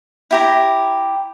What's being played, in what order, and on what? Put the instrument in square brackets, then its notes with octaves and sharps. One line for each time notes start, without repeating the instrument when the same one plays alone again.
[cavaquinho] E4 G4 A#5